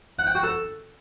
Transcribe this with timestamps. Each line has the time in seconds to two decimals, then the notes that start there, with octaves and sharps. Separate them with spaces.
0.19 F#5
0.27 G5
0.35 F#4
0.43 A4